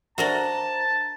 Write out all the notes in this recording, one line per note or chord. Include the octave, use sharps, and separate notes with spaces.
D4 F#4 A#4 C5 D5 E5 A5 A#5